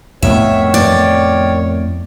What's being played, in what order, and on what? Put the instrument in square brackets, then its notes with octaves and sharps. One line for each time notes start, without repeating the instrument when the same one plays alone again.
[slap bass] F2 A2 B3 [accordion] D#3 C#5 [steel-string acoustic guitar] E5
[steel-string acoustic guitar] D5